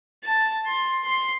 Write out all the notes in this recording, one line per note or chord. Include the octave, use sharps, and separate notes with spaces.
A5
C6
C6